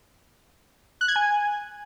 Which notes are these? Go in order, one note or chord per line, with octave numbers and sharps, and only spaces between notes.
F#6
G#6
G#5